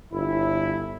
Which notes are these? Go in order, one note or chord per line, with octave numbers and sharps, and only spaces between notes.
G1 E4